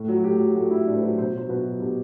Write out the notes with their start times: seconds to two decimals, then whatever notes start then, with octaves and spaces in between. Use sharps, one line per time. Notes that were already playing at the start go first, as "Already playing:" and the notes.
Already playing: A2
0.08 F#3
0.16 F#4
0.24 A2 G4
0.39 F#3
0.55 A2 F#4
0.70 F#3 E4
0.87 A2 D4
0.95 C5
1.01 F#3 B4
1.18 B2 C5
1.34 F#3 C5
1.49 B2 B4
1.64 F#3
1.80 B2 G4